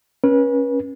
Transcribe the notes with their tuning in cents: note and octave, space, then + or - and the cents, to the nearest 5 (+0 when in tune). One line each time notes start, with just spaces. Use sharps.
C#4 -10 B4 -35